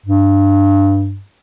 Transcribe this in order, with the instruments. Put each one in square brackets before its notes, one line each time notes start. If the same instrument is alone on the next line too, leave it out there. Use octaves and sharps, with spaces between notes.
[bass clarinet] G2